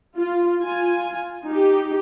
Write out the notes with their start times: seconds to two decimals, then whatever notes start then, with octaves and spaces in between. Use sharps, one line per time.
0.16 F4
0.62 F4 G#5
1.47 D#4 G4